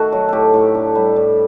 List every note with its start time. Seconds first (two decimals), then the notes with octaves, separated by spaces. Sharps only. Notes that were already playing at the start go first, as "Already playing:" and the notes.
Already playing: D#3 A3 D#4 F#4 A4
0.12 F#3
0.29 A2 G4 A4
0.54 A2
0.75 D4
0.95 G3
1.16 A2